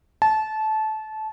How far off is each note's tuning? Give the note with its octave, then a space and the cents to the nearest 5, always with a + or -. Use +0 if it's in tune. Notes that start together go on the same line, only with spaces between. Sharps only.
A5 -20